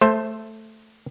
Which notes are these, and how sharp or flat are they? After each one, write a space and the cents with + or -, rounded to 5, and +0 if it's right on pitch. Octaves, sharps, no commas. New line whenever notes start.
A3 +0 C5 +15